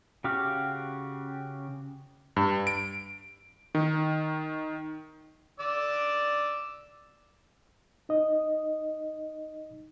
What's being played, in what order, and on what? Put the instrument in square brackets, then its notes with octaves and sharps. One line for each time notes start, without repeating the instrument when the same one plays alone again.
[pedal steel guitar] C#3 F#4 G4 F5
[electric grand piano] G2
D7
D#3
[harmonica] D5 D6 E6
[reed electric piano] D#4 D#5